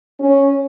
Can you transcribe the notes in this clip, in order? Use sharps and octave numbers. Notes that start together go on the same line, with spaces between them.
C#4